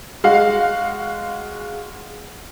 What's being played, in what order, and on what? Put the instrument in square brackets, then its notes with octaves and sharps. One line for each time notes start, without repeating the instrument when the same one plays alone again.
[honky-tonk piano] G#3 F#4 F5